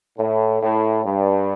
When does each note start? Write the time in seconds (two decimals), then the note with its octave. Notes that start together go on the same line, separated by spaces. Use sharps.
0.19 A2
0.62 A2
1.05 G2